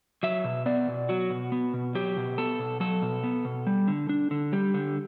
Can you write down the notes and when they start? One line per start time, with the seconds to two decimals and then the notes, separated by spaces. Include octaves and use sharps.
0.23 F#3 E5
0.44 B2
0.66 B3 D5
0.88 B2
1.09 F#3 F#4
1.30 B2
1.52 B3
1.74 B2
1.95 F#3 G4
2.17 B2
2.38 B3 A4
2.59 B2
2.80 F#3 A4
3.02 B2
3.24 B3
3.45 B2
3.67 G3
3.88 D3
4.09 D4
4.31 D3
4.53 G3 G4
4.74 D3